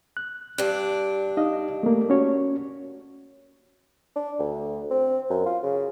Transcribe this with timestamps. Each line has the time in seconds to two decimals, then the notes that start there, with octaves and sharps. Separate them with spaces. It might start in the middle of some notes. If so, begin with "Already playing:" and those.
0.17 F#6
0.58 G2 D4 F#6
1.37 D#4 D#5 F5
1.83 A3 A#3
2.10 C#4 F#4 C#5
4.16 D4
4.39 D2
4.91 C4
5.30 F#2
5.46 F4
5.63 C#3